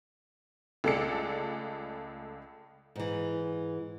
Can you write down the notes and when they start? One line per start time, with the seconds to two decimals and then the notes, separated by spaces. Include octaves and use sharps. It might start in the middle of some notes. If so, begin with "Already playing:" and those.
0.84 C#2 A3 G#4 A4 D5 C#7
2.96 G#2 E3